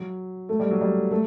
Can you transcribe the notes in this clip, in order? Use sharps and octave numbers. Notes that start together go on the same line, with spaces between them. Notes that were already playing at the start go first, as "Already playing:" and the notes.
Already playing: F#3
A3
G3
F#3
G3
A3